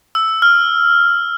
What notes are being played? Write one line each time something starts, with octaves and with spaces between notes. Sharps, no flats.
E6
F6